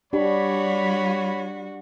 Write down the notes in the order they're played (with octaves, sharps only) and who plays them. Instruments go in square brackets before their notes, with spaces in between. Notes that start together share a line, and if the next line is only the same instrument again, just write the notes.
[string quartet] G3 F#4 [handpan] D4 G4 [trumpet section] C#5 B5